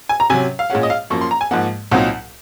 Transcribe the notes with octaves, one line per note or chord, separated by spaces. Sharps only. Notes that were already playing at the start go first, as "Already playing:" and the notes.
G#5
A#5
C3 F#3 C#4 G#5
F5
A#2 G#3 C#4 F#5
D#5
F5
F#2 F3 A#3 C#6
C6
A#5
G#5
G#2 F3 A#3 F#5
C2 A#2 F#3 C4 D#4 F#5